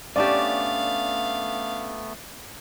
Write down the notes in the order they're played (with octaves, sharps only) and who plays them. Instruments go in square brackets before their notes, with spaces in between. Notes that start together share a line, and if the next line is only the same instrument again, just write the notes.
[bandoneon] A3 B3 [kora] C#4 D4 G4 [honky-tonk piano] D5 [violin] F5